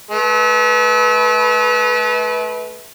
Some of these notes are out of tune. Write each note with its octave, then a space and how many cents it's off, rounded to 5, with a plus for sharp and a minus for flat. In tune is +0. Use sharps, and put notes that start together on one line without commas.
A3 -40 B4 -10